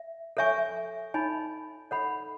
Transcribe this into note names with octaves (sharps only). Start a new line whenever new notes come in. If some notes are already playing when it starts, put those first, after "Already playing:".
Already playing: E5
A4 C#5 E5 G#5 C#6
D#4 A4 C#5 G#5 B5
A4 C#5 F#5 B5